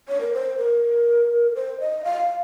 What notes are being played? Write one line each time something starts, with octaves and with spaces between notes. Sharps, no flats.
C#5
A#4
C5
A#4
C5
D#5
F5